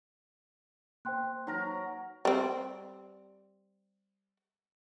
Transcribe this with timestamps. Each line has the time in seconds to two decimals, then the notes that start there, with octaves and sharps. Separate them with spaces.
1.05 A#3 C5 G5 C6 F#6
1.47 F#3 D#4 A#4 A#6
2.25 G3 C4